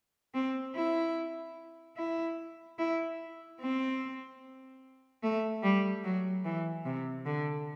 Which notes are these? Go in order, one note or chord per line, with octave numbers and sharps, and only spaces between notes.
C4
E4
E4
E4
C4
A3
G3
F#3
E3
C3
D3